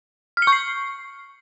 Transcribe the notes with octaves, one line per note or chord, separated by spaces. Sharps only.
F6
C#7
C#6
C7